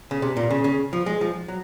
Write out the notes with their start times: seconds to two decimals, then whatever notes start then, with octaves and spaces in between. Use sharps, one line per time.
0.11 C#3
0.22 C3
0.37 A#2
0.50 C#3
0.64 C#3
0.93 F3
1.06 G#3
1.21 F3
1.48 F#3